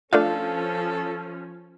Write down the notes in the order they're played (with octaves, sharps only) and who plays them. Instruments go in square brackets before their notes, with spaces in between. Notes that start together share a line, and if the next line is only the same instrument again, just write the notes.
[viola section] F3 C#4 [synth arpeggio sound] A3 D4 F4 [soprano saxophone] A4 [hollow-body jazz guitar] F5